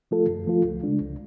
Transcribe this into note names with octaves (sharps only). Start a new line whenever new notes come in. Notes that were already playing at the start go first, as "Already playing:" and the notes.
F3 A3 F4 A4
F#2
F3 A3 F4 A4
C#2
C#3 G#3 D4
C#2